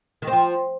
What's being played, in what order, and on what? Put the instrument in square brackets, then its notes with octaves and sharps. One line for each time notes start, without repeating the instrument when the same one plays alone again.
[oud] D#3
C4
F3